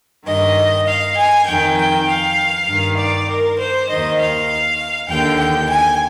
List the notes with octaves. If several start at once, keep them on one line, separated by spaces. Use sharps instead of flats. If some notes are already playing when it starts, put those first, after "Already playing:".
G2 D#3 D#5
F5
G#5
F2 D#3 G5
G5
F5
G2 D#3
D5
A#4
C5
D#2 D#3 D#5
F5
D#2 D3 G5
G5
G#5